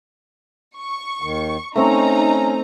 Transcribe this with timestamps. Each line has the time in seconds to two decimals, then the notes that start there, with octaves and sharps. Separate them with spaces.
0.78 C#6
1.22 D#2 D#3
1.76 A3 C4 C#4 D#4 A#5 C#6